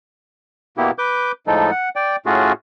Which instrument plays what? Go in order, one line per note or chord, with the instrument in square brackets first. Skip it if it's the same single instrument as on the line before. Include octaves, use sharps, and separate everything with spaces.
[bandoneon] B2 A#3 B3 E4 G4
B4 D6 G6
A2 F3 G#3 D#4 A4
F#5
D5 G5
A2 A3 C#4 F4 F#4 G#4